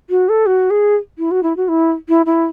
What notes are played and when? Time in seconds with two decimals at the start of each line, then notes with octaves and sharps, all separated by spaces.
0.10 F#4
0.29 A4
0.46 F#4
0.70 G#4
1.18 E4
1.31 F#4
1.43 E4
1.56 F#4
1.68 E4
2.09 E4
2.26 E4